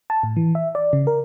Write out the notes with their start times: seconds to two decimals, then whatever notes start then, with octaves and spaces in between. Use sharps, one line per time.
0.10 A5
0.23 A2
0.37 E3
0.55 E5
0.75 D5
0.93 C#3
1.07 A#4